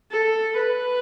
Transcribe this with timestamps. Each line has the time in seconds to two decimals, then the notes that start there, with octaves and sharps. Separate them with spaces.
0.11 A4
0.57 B4